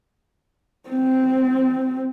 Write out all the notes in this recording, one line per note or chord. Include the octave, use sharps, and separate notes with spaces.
C4